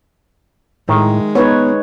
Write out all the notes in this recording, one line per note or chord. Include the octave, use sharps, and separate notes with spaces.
A2 D#3 G#3 E5
B3 D#4 B4 C#5